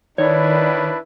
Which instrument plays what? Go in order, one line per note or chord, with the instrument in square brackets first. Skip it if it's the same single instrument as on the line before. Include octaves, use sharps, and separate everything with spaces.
[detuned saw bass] D#3 [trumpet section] D4 E4 B4 [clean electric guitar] C#5 [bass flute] D5